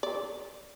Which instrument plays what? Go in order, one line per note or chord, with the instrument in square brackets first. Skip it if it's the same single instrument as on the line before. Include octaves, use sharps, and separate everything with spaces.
[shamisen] D5